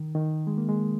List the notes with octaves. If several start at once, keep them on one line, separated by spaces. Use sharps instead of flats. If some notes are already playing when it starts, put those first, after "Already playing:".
Already playing: D#3
D#3
G#3
A#3
G#3